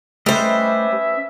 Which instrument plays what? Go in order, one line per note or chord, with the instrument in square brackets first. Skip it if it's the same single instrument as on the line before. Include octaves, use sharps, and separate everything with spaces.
[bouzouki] G3 C5 [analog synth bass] A3 [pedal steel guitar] C#4 B4 D#5 [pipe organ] E5